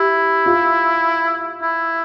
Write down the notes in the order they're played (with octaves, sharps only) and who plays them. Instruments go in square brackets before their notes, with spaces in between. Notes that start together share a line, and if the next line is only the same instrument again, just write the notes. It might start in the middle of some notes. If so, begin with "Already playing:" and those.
Already playing: [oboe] E4 [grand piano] G4
[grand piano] F4
[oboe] E4